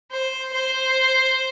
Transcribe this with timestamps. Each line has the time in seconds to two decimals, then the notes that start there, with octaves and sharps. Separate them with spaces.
0.11 C5
0.53 C5